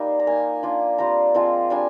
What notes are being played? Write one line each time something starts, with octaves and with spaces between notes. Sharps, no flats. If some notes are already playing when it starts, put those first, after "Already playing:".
Already playing: G3 A#3 D#4 F4
A#5
A#3 D#4 G#5
A#3 D4 F4
G3 C4 F4 A#5
F3 G#3 C4 F4
G3 D4 F4 G#5